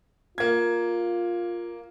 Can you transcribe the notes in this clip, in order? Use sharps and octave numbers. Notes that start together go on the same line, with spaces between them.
A#3 F4 G#6